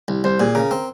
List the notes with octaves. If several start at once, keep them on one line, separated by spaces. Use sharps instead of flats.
C2
C2 C5
A#2 G#4
C#3 A#4
C4